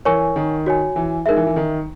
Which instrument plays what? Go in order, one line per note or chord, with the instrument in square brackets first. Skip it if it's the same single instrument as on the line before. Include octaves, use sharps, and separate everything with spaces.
[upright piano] E3 [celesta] A#4 C#5 G#5 C#6
[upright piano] D#3
[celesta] F#4 C#5 G#5
[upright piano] E3
[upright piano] G#3 [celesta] E5
[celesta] D#4 A#4
[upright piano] E3
E3
D#3